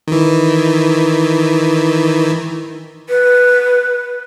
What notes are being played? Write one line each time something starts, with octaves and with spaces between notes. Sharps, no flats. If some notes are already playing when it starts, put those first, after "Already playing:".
D#3 E3
B4